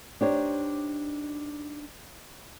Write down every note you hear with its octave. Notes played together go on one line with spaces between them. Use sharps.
D4 D#4 G4 C5 C#5